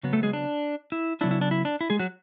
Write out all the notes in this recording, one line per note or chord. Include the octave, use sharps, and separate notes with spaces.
C#3 F#3 B3
A3 A4
G#3 G#4
D4
E4
C#3 F#3 B3 D4 E4
E4
D4
E4
D4
E4
G#3 G#4
F#3 F#4